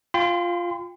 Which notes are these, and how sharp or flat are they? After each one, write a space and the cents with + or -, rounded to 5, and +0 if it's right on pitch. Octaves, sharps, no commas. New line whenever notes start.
F4 +0 G5 +20 C6 -40